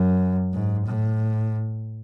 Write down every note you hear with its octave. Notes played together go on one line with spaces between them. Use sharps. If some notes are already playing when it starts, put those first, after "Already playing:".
Already playing: F#2
G#2
A2